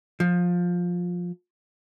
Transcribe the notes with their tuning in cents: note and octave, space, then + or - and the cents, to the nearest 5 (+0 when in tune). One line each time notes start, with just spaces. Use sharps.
F3 +15